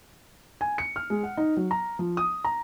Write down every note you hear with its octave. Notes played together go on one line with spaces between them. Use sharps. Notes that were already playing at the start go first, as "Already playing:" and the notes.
G#5
C#7
F6
G#3
F#5
D#4
F#3
A#5
F3
D#6
A#5